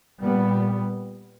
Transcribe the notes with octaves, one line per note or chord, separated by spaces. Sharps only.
A#2 G3 B3